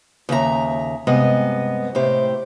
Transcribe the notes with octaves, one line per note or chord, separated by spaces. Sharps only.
D#2 C#3 E5 A#5
G2 C3 G#3 B3 D#5
A2 C3 G4 C5